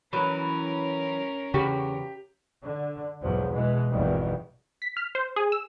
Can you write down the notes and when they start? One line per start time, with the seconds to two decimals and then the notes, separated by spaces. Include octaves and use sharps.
0.13 E3 F#3 C#4 A#4
1.54 E2 C#3 F#4 G4
2.62 D3
3.21 B1 E2 G#2 F3 F#3
3.53 B2 E3 G#3
3.90 G#1 E2 G2 B2 D#3 G3
4.82 B6
4.97 F6
5.15 C5
5.36 G#4
5.52 E6